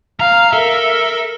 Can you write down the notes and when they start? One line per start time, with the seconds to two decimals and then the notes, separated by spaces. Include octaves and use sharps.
0.20 F5 A#5
0.53 A4 A#4 E5